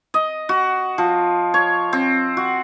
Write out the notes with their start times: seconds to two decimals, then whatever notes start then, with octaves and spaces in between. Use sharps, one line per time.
0.14 D#5
0.49 F#4
0.98 F3
1.54 C#5
1.93 C4
2.37 F#4